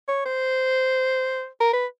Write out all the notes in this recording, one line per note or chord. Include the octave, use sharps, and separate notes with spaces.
C#5
C5
A#4
B4